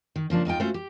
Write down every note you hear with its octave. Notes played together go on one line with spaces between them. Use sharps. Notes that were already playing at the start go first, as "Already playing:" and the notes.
D#3
C#3 F3 A#3 D4
E2 D#4 F4 G5
A3 C#4 F4 F#4 C5
G4